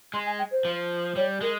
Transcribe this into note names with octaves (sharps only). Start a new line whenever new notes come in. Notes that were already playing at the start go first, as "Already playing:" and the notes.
G#3 C6
G#5
G5
C5
F3
G3 C#5
G#3 A#4